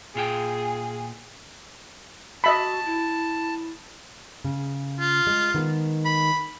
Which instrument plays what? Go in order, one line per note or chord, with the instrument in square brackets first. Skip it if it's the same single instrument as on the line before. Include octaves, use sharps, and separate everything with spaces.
[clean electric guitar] A#2 F4 G5 [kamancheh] G#4
[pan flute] F#4 [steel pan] D#5 E5 B5 [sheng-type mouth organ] A5
[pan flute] E4
[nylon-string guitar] C#3
[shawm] F4
[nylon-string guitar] G#3
D#3 G#3 B3
[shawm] B5